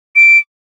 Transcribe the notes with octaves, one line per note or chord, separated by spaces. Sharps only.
D7